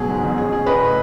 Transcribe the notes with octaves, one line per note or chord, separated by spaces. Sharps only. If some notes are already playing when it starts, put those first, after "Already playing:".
Already playing: B2 F#3 G#4
G#2
A1
C#4 G#4
C#4 G#4
C#3 B4 D#5
A2